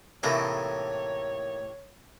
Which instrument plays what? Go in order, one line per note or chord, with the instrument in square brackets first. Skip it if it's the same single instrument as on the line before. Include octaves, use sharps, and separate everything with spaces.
[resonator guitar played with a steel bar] A2 C3 E3 [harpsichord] A3 A#3 D#4 [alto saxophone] C#5